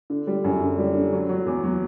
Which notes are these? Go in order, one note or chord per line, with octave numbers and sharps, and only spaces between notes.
D3
G3
F#2
D3
G3
D3
F#3
F#3
E2
F#3